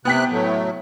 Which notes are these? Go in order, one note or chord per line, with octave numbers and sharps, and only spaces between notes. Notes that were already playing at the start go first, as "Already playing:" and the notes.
C3 B3 G5 F#6 B6
A2 F#3 A3